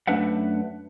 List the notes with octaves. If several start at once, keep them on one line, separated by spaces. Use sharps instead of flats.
F#2 A3 D4 B4 E5 F#5